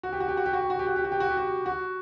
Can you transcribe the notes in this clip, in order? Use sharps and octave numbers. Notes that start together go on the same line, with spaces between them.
F#4
G4
F#4
G4
F#4
G4
F#4
G4
F#4
G4
F#4
G4
F#4
G4
F#4
G4
F#4
F#4